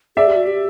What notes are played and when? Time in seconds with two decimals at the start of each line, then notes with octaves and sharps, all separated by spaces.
0.16 G#4 D5 E5
0.27 G4
0.36 F#4
0.47 G4